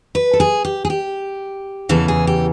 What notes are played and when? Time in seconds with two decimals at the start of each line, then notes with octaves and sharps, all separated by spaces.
0.15 B4
0.33 A4
0.40 G#4
0.65 G4
0.85 G#4
0.90 G4
1.89 E2 C#3 E3 A4
2.08 G#4
2.27 G4